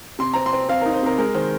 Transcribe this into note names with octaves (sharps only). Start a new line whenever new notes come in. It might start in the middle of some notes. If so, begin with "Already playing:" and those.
C3 C6
C4 A#5
C6
C4
C4 F5
A#4
D#4
C5
C3 A#4
G#3 A#4
D#3 C5